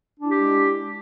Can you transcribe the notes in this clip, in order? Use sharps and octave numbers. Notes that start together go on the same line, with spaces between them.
G#3 D4 E4 G4